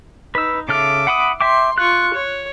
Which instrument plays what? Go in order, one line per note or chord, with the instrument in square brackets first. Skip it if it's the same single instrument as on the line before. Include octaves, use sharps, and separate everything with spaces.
[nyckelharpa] D#4 [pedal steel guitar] B4 E6
[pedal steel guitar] C#3 A4 F6 [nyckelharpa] E5 D6
[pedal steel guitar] F#5 B5 D#6
[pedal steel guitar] E5 G5 D6 [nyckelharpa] C6
[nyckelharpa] F4 C#6 [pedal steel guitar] F#6
[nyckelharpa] C#5